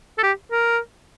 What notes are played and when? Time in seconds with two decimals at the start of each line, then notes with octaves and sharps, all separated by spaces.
0.18 A4
0.23 G4
0.52 A#4